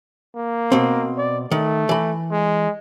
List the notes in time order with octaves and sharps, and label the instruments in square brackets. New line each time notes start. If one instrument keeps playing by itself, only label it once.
[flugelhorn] A#3
[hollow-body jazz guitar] B2 C4
[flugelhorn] D5
[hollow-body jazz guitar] D#3 [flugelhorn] A3
[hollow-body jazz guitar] E3 B5
[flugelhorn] G#3